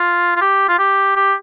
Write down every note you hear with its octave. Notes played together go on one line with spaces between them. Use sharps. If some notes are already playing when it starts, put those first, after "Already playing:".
Already playing: F4
F4
G4
F4
G4
G4